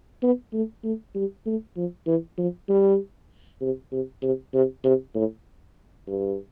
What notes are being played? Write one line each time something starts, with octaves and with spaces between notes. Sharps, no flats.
B3
A3
A3
G3
A3
F3
E3
F3
G3
C3
C3
C3
C3
C3
A2
G2